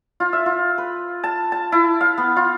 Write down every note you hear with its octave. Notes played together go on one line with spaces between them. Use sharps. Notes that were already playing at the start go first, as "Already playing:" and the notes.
F4
E5
F4
B4
A5
A5
E4
F5
B3
F4